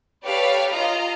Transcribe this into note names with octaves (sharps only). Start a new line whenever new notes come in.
G4 A4 B4 C#5 D5 F5
F4 D#5 F5 A#5